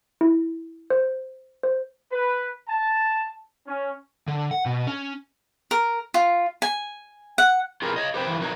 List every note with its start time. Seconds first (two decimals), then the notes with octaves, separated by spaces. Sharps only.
0.21 E4
0.90 C5
1.63 C5
2.12 B4
2.69 A5
3.67 C#4
4.28 D3
4.51 F#5
4.66 B2
4.87 C#4
5.71 A#4
6.14 F4
6.62 G#5
7.38 F#5
7.82 F4 G4 G#4 A#4 B4
7.96 C#5 D#5
8.14 G4 B4 C5 G5
8.28 E3 G4 B4
8.41 D#4 F#4 A#4 B4 C#5